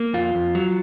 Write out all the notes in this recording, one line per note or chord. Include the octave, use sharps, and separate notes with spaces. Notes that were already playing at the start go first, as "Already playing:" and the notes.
Already playing: A#3
F2 F4
F2
F#3